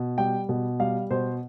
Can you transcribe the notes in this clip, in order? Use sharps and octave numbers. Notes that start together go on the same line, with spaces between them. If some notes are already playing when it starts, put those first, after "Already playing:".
Already playing: B2
G3 G5
B2
G3 F5
B2 C5